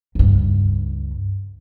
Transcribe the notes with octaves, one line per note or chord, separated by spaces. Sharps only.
C#2 G2